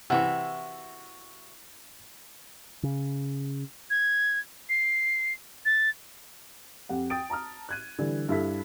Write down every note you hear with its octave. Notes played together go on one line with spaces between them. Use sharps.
C3 E3 F#4 E5 C#6
C#3
G#6
C7
A6
F2 G4 F#5
G5 D#6 A6 D7
A5 A#5 D#6 F6
F#6 G#6 D#7
D3 E3 G3
G2 E4 A4 B6